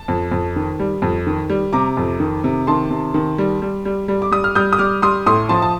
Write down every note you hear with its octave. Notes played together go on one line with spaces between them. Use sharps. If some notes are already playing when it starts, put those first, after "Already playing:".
Already playing: A5
F2
F2
D#3
G3
F2
D#3
G3
C3 A#5 D6
F2
D#3
C3
D#3 A5 C6
C3
D#3
G3
G3
G3
G3
D6
G3 D#6
F6
G3 D#6 G6
D#6
G3 D6 F6
G3 C6 D#6
A2 C6 D#6
F3 A5 C6
A5